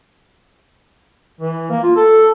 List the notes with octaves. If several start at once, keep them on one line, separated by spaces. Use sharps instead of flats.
E3
A#3
F4
A4